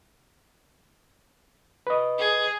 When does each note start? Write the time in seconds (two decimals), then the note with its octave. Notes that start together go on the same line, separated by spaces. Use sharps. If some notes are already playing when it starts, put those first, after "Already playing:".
1.87 B4 D#5
2.18 G#4